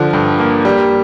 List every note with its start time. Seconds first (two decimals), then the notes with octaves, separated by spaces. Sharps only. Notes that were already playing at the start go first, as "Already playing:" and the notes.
Already playing: D3 F3
0.13 G2
0.40 A#3
0.65 G3